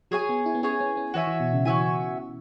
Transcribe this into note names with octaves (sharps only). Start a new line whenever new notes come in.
F#3 G#4 C#5 G#5
B3
E4
B3
C#4 G#4 C#5 G#5
C#4
C#4
E3 F#4 C#5 E5 G#5
E3
B2
C#3
E3 F#4 C#5 E5 G#5